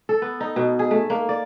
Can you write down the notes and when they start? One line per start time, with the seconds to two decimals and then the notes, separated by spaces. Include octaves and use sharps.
0.09 A4
0.22 B3
0.40 D#4
0.56 B2
0.79 G#4
0.91 A3
1.10 A#3
1.29 D5